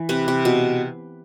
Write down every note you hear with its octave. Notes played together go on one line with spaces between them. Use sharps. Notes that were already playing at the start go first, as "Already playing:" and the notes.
Already playing: E3
C3 B4
C3
B2